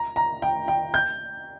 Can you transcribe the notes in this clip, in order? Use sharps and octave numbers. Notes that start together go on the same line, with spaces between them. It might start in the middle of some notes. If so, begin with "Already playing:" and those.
Already playing: A#5
A#5
G5
G5
G6